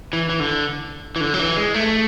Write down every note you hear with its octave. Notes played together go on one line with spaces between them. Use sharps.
E3
E3
D3
E3
D3
F#3
E3
G#3
A3